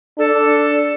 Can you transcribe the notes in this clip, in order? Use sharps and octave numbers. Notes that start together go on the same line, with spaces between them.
D4 A4